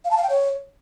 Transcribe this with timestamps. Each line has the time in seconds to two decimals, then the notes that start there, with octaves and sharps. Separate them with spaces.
0.04 F5
0.11 A5
0.17 F5
0.23 G5
0.29 C#5